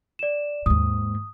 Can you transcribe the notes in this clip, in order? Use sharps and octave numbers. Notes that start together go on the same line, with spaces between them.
D5 E7
D#2 G#2 D#6